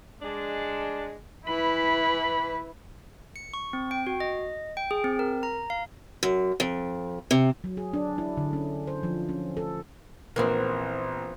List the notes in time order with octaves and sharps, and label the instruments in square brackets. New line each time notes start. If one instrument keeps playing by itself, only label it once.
[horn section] G#3 D4
[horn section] E3 B5 [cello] E4 B4
[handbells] C#7
C#6
C4
G5
F#4
D#5
G5
G#4
C4
A#4
A#5
F5
[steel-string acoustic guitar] F#2
F2
C3
[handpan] F#3
G#4
D4
E4
D3
C#4
C5
F3
C#4
A4
[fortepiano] A#1 A#4 [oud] E3 B3 C4